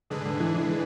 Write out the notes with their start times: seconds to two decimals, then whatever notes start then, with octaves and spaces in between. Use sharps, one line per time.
0.10 G#2 D3 G#3 D4 G#4 B4
0.25 D3
0.40 E3
0.54 E3